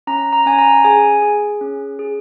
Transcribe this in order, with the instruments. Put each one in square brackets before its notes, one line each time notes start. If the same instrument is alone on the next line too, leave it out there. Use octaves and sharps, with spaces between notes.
[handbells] C#4 A#5
A#5
C#4 G#5
A#5
G#4 G#5
G#4
C#4
G#4